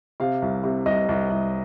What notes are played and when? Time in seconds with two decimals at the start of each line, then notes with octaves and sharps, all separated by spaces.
0.20 C3 F5
0.42 C2
0.64 C3
0.86 C2 D#5
1.09 C2
1.30 C2